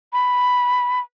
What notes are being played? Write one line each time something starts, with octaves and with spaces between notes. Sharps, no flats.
B5